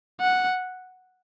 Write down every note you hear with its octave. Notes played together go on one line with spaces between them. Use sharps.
F#5